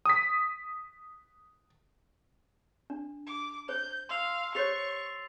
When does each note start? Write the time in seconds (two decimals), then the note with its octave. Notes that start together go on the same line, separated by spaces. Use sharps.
0.05 D#6 B6
2.90 D4
3.26 D6
3.69 C5 G6
4.09 F5 C6 E6 F7
4.55 G4 C5 C#5 C#6 A6 C7 F7